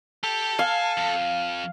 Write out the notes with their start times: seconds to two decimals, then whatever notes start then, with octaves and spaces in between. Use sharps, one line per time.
0.23 G4 A4
0.59 F5 G#5
0.97 F2